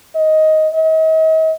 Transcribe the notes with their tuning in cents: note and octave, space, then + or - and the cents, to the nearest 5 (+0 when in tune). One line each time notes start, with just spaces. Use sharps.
D#5 +10
D#5 +40